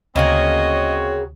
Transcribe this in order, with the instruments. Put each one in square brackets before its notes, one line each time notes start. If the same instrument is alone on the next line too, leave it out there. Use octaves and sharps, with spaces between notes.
[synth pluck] D2 [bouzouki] C#3 A#3 G#4 [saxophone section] C4 F#4 C#5 [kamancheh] D#5